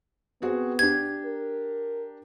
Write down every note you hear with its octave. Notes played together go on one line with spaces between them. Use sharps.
B3 C4 F#4 G#4
D4 G4 G#6
A#4